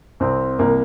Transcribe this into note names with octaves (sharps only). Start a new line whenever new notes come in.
C2 C4
C2 A#3